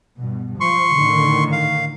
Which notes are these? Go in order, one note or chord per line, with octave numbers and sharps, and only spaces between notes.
G2 B2
F3 C6 C#6
A2 D3 D#3
F5